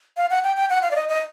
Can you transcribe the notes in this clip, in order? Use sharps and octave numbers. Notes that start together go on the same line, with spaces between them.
F5
F#5
G5
G5
F#5
F5
D5
D#5
D#5